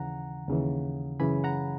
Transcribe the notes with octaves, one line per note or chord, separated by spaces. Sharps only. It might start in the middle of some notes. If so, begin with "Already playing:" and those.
Already playing: D#2 C#3 E3 F#5 A#5
D#2 C#3 E3
F#2 C#3 E3 G#5 B5
F#5 A#5